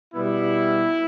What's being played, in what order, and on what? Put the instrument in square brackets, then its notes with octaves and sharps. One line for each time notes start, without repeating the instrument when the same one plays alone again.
[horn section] B2 G3 B3 E4